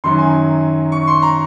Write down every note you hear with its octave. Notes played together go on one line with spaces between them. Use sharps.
F#2 D#3 F#3 C6
G#5
C#6
C6
A#5